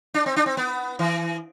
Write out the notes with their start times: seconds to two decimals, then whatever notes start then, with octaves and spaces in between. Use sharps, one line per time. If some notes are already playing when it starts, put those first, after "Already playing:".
0.14 D4
0.26 C4
0.36 D4
0.46 C4
0.57 B3
0.99 E3